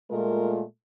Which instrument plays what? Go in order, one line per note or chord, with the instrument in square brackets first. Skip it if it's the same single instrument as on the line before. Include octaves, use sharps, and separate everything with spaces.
[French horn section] A#2 G#3 A3 F4 A#4